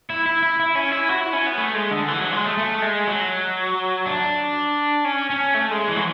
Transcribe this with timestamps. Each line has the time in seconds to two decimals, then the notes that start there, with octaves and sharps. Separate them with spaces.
0.10 E4
0.26 E4
0.43 E4
0.60 E4
0.75 C#4
0.92 E4
1.09 F#4
1.21 E4
1.33 C#4
1.47 B3
1.58 A3
1.75 G#3
1.91 D3
2.08 E3
2.21 F#3
2.33 G#3
2.46 A3
2.58 A3
2.82 G#3
3.07 F#3
4.06 D4
5.05 C#4
5.30 C#4
5.54 A3
5.71 G#3
5.88 E3
5.96 F#3